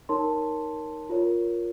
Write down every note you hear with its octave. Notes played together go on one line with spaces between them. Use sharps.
D#4 A#4 C#5 A5 C6
F4 A#4 C#5